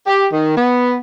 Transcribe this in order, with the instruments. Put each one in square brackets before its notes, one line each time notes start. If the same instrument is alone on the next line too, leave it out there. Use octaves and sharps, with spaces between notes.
[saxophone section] G4
D#3
B3